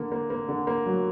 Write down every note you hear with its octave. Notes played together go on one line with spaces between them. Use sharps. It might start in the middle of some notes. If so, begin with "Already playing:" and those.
Already playing: D3 A#3
A#3
A#3
D3
A#3
F#3